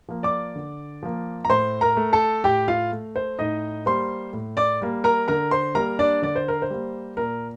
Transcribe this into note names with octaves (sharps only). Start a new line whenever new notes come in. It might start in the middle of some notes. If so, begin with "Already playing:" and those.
F3 A#3
D5 D6
D3
F3 A#3
A#5
A2 C5 C6
A#4 A#5
A3
A4 A5
A2 G4 G5
F4 F5
A3
C5
A2 D#4 D#5
G3 A#3 C5 C6
A2
D5 D6
G3 A#3
A#4 A#5
D3 A#4 A#5
C5 C6
G3 A#3 A#4 A#5
D4 D5
D3 D5
C5
A#4
C5
G3 A#3
A#2 A#4